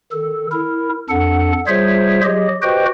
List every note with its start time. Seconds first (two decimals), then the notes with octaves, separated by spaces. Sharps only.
0.12 D#3 A4
0.52 E4 A#4
1.10 F2 D4 A4 F#5
1.67 G3 F4 G#4 C5 C#5 E5
2.24 F#3 G4 G#4 D#5
2.62 F#4 G4 B4 C5 D#5 G5